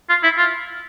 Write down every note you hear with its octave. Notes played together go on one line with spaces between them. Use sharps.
F4
E4
F4